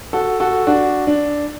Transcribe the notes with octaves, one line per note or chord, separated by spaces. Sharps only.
F#4 A4
F#4 A4
D4 F#4
D4